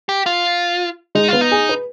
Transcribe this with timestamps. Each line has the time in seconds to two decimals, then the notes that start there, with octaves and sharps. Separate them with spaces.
0.09 G4
0.26 F4
1.15 G#3 D#4
1.28 B3 F4
1.41 D#4
1.52 G#4
1.69 B4